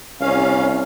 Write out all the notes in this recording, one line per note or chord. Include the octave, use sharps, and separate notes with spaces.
C2 C#4 F5